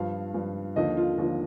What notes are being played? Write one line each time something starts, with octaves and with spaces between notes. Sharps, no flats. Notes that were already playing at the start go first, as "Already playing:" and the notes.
Already playing: G2 F3 F5
G2 F3
D#2 D3 F3 D#5
F4
D#2 D3 F3 F4